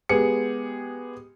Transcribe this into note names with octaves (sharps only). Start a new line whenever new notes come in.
G#3 B3 G4 G#4 C#7